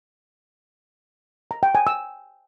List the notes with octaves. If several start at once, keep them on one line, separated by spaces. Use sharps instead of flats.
A#5
G5
G#5
E6